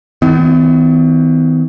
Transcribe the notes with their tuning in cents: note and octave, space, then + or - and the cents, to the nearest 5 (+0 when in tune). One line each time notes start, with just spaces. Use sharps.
D#3 +45 B3 +45